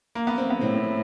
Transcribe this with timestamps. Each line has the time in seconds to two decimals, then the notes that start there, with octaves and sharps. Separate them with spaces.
0.15 A#3
0.27 B3
0.38 C4
0.50 B3
0.61 A2 C4